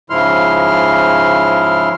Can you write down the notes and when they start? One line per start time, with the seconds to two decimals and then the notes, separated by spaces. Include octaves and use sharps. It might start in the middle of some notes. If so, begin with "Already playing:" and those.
0.10 G#2 C#3 F3 E4 C6 F6